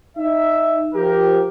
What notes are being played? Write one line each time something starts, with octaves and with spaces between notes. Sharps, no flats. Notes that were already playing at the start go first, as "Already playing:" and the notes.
D#4 E5
F3 G4 A#4